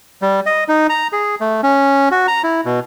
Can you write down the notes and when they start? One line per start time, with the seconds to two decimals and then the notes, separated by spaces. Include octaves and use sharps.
0.22 G3
0.46 D#5
0.68 D#4
0.90 A#5
1.12 G#4
1.41 A3
1.63 C#4
2.11 F#4
2.28 A#5
2.43 E4
2.65 B2